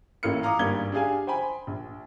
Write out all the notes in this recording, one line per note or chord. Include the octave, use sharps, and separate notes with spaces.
A1 A2 A#3 F6 C#7
F5 A#5 D6 D#6
G#1 G2 G3 A#3 G#6 G7
D4 G4 G#4 F5 G#5
C5 G5 G#5 B5
A#1